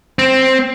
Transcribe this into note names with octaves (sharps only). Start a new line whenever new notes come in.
C4